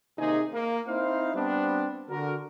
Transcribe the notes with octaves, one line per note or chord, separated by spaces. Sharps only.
C3 D#3 A#3 D#4 G#4
A#3
C4 D#4 E4 C5 F5
G3 B3 C4 D4
D3 F#4 A#4